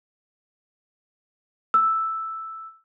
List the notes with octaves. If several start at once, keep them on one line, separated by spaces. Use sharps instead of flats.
E6